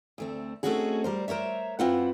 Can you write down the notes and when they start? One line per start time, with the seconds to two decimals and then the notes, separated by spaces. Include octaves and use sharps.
0.18 D2 A3 C4
0.63 A3 C4 C#4 D#4 F#4 G#4
1.04 G3 A#4 C5
1.28 A#4 C5 C#5 E5
1.79 F#2 C4 E4 F4 B4 F#5